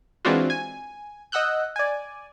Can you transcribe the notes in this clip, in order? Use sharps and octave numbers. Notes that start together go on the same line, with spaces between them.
E3 G#3 C4 D4 F4 F#4
G#5
D#5 F#5 E6 F#6 G6
D5 G#5